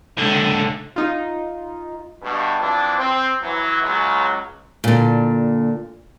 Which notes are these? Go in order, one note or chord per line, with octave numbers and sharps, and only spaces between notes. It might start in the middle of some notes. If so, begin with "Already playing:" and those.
C#2 D3
D#4 F4
G2 B2
E3 F3 C4 D4
C4
E3 F#3
C#2 F#3
A#2 D3